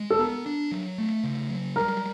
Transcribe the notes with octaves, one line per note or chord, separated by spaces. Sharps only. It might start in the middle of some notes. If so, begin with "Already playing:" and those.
Already playing: G#3
A4
B3 A#4
D4
F#3
A3
C#3
F#3
G3 A#4